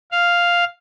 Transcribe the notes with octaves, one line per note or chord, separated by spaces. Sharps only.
F5